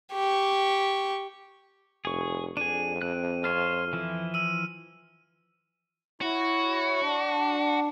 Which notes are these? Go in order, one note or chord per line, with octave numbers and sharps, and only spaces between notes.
G4 C#6
F1 G#4 C#6
F2 D4 G#4 D#7
C4 F#6
F4 C5 C#5 F6
E3 F3 E4
E6 D#7
E4 F#4 C#5
D4